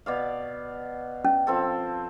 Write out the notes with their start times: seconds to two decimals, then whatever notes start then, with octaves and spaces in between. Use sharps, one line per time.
0.06 B2 D5 F5
1.25 C#4
1.47 F3 C4 A4